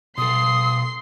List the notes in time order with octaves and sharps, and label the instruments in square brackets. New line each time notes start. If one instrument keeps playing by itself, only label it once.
[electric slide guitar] B2 A4 [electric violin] C6 C7 [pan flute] D#6